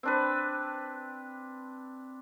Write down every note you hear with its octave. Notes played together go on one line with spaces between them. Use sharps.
C4 D4 B4